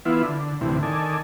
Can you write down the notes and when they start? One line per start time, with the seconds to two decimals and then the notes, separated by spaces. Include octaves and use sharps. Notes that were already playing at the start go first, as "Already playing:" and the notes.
0.05 E3 B3 E4 F4
0.22 D3
0.61 D2 A2 C3 E3
0.83 D#3 A4 D5 G#5